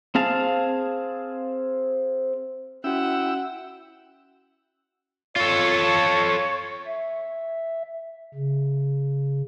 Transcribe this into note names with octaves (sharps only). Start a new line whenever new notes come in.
C4 G#4 F5 A5
C#4 E4 F#4 F#5 G5 E6
F4 A4 C#5
E5
C#3